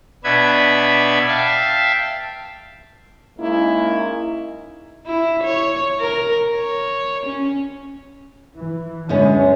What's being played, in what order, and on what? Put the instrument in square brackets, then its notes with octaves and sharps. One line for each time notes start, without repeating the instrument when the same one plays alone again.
[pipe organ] B2 B3 D4 B4 E5 G#6
E5 F5 G5 A5
[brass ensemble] G#3 A#3 C#4 D#4 E4
[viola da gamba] E4
C#5
A#4
C#5
C#4
[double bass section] E3
[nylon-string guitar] F#2 B3 C#4 [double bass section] D3 G#3